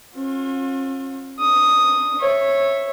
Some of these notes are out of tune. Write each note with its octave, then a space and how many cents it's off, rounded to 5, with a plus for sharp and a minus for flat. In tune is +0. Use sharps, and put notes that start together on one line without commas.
C#4 -45 F4 +40
D4 +0 D#6 +0
C#5 -15 E5 +0